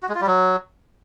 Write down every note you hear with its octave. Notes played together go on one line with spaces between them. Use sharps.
F#4
G#3
F4
G3
F#3